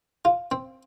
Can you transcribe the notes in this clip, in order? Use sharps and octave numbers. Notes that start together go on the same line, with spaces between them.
F4
C4